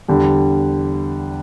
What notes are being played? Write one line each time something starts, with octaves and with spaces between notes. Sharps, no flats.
E2 D3 G3